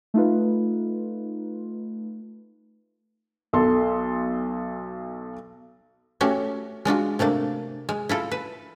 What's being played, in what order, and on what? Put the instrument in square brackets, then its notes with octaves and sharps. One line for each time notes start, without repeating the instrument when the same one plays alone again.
[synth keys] A3 D#4 F4 B4
[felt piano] B1 A4 C6
[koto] A3 C#4 F#4 G4
G#3 D4 F4 F#4
C3 A3 A#3 D4
G#3
E4 F4 A4
B4